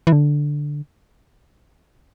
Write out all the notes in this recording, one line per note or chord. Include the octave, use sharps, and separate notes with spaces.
E3
D3